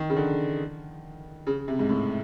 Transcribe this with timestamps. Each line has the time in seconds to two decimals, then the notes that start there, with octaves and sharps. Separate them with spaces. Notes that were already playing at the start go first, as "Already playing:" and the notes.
Already playing: D#3
0.10 C#3
0.17 D3
1.47 C#3
1.68 C3
1.79 G#2
1.89 A2